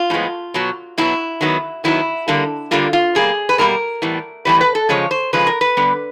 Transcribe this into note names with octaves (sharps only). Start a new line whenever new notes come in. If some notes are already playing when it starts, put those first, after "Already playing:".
Already playing: F4
A2 F3 G#3 B3
B2 F#3 B3
B2 F#3 B3 E4
D#3 F#3 B3
D#3 F#3 B3 E4
D3 G3 A#3
D3 G3 A#3 F4
F4
B2 G3 A#3 G#4
B4
B2 G3 A#3 A#4
A2 E3 G3 B3
A2 E3 G3 B3 B4
B4
A4
C#3 F3 G#3 C#5
C5
C#3 F3 G#3 B4
A#4
B4
D3 G3 B3